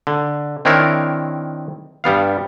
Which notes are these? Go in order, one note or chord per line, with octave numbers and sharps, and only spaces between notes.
D3
D#3 C4 D4 E4 A#4 C#5
G2 G3 B3 F5